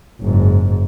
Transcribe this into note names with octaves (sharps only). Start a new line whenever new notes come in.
F#1 G#2